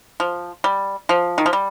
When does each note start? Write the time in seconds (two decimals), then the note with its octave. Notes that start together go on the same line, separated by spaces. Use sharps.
0.20 F3
0.64 G3
1.09 F3
1.38 D#3
1.46 F3
1.53 G3